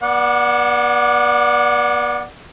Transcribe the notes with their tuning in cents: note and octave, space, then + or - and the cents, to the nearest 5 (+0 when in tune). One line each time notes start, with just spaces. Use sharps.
B3 -40 D5 +0 F#5 +0